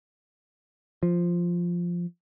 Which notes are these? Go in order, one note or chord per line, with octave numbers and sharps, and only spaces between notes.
F3